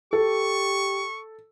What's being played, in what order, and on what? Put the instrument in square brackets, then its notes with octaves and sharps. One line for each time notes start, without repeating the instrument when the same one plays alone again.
[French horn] G4 [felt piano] A4 [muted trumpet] C#6